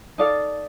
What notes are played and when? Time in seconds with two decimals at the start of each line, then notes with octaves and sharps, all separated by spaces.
0.18 D#4 A4 D5 F5